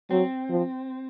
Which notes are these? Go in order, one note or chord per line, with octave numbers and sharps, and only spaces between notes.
F#3 C4
F3